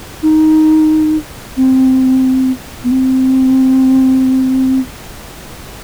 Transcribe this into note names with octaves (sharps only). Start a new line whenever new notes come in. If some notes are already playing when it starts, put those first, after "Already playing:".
D#4
C4
B3
C4